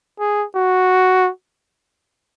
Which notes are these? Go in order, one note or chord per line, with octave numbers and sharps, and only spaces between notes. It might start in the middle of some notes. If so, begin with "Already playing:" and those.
G#4
F#4